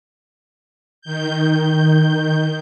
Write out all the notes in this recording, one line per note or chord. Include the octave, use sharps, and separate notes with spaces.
D#3 G6